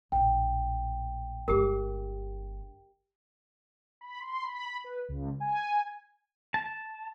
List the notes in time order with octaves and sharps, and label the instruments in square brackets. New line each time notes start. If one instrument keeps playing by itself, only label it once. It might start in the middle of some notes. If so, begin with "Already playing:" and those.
[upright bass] A#1 A2 [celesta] G5
[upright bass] G1 G#3 [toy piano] G4 G#4 A#4
[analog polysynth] B5
C6
B5
B5
B4
C#2
G#5
[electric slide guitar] A5